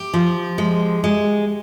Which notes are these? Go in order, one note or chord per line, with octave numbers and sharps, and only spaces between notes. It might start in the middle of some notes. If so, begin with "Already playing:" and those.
Already playing: G4
F3
G#3
G#3